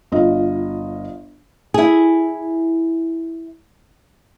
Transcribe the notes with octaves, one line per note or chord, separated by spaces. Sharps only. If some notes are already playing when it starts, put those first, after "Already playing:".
G1 F4 D#5
E4 G#4